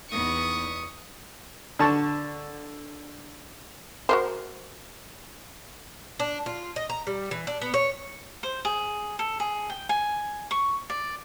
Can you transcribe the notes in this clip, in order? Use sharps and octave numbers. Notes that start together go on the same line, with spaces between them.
E2 B3 D#4 C#6 D#6
D3 A5 C#6
F#4 A#4 C5
D4
F4
D#5
A#5
G3
E3
D4
B3
C#5
C5
G#4
A4
G#4
G5
G#5
C#6
D5